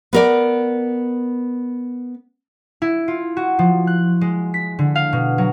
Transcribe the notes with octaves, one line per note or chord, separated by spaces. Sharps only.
B3 A#4 D5
E4
F4
F#4
F3
F#6
G#3
B6
D3
F5
B2
F#3